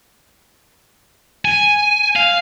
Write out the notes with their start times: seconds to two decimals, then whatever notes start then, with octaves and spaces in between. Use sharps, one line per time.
1.45 G#5
2.16 F5